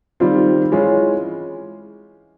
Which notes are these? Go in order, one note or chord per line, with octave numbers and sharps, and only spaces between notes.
D#3 G3 C4 F4
E3 G#3 C#4 F4